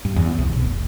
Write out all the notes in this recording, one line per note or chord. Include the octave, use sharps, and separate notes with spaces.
G2
E2
C2
B1
F1